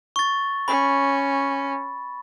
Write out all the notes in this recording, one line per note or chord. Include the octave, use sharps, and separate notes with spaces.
C#6 A6
C#4 B5